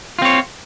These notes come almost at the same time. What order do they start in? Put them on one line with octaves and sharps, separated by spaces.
F4 C4 C#5